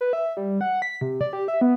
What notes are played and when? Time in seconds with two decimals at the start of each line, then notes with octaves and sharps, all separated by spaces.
0.01 B4
0.13 E5
0.37 G3
0.61 F#5
0.82 B6
1.01 C3
1.21 D5
1.33 G4
1.48 E5
1.61 B3